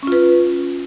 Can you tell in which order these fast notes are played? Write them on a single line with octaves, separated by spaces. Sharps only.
C#4 F4 B4